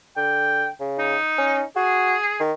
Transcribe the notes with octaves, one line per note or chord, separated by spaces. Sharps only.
D3 G5
C#3
D#4
C#4
F#4 G#4
D#3